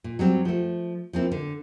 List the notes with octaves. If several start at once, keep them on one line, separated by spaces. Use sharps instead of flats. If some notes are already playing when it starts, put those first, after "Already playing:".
A#2
F#3 G3 C4
F3 A3
F3 A#3 C4 E4
D3